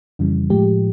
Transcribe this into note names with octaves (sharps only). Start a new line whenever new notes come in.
F2 C#3 E3 G3
A2 F3 G#3 G4